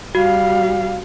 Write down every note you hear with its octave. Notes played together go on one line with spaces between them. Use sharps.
G3 F#4 F5